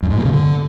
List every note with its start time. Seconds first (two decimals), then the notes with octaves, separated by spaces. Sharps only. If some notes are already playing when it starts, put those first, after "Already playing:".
0.03 F#2
0.10 G#2
0.18 A#2
0.25 C#3
0.33 D3